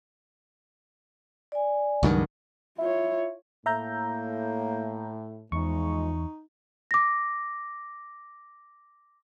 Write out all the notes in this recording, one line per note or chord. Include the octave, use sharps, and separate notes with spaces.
D5 G#5
C#2 G2 D#3 F#3
E4 F4 C#5
A2 A#3 E5 A#5 G6
E2 F3 G#3 D#4 C#6
D6 A#6